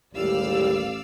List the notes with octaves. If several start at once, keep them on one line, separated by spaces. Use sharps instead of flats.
A1 D#2 G#2 G3 D5 F5 E6